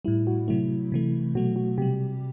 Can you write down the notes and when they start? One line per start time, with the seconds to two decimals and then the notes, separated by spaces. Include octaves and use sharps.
0.05 A2 G3 E4
0.27 F#4
0.48 C3 F#3 A3 E4
0.92 C3 E3 A3
1.35 B2 F#3 A3 F#4
1.56 F#4
1.78 C3 G3 G4